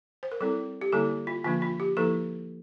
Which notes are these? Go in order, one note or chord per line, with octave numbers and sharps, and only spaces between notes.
C5
A#4
G3 C4 E4 A4
G4
D3 G3 A#3 E4 A4
F4
D3 F3 A#3 D4 F4
F4
G4
F3 A#3 E4 A4